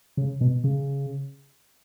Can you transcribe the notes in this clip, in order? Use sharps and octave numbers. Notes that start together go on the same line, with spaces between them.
C#3
B2
C#3